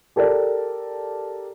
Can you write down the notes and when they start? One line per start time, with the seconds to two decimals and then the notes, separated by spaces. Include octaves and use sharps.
0.16 G4 A4 A#4 D5